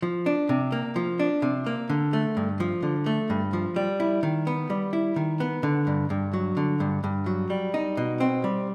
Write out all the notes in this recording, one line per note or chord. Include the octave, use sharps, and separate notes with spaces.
F3
D4
C3
A#3
F3
D4
C3
A#3
D3
A3
G2
F3
D3
A3
G2
F3
G3
E4
D#3
B3
G3
E4
D#3
B3
D3
G2
G2
F#3
D3
G2
G2
F#3
G3
D#4
B2
C4
G3